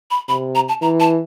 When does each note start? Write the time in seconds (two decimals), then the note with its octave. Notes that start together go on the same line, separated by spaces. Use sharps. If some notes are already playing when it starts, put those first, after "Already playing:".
0.11 B5
0.28 C3 B5
0.55 A#5
0.69 A5
0.82 E3 A#5
1.00 A5